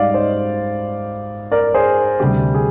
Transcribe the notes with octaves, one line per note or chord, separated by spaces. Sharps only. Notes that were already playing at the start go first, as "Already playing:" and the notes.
Already playing: G#2 G3 D5 D#5 F5
C5 D#5
A#4 D5
G#4 C5
D2 C3 G3 G4
G#4